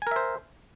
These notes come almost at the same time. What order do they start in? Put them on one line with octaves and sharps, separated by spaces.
G#5 A#4 E5 C5